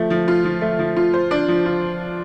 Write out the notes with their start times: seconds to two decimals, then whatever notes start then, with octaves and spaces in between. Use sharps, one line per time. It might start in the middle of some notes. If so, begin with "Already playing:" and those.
Already playing: F3 A3
0.10 F3
0.28 F4
0.44 F3
0.61 A3
0.79 F3
0.96 F4
1.14 C5
1.31 D4
1.48 F3
1.66 F4